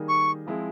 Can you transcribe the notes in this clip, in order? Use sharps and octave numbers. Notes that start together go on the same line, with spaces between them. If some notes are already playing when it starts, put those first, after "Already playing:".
Already playing: D#3 G3 A#3 D#4 G#4
C#6
F3 G#3 C4 E4